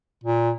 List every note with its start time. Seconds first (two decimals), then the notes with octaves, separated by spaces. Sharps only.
0.23 A#2